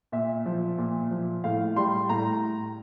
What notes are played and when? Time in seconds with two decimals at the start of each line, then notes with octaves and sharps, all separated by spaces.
0.12 A#2 E5
0.46 F3
0.78 A#2
1.11 F3
1.44 A2 F5
1.76 G3 C6
2.09 A2 A#5